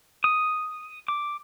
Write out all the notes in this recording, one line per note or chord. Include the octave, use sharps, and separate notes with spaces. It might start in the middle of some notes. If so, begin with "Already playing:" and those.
D#6
D6